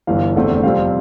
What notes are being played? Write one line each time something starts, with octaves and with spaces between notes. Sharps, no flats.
G1 G2 E3 F5
F1 E2 D3 A3 C4
F2 C3 G3 C4 F5